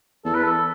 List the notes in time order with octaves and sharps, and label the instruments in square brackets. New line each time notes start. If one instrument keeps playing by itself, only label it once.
[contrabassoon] E2 [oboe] A4
[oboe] B4
A4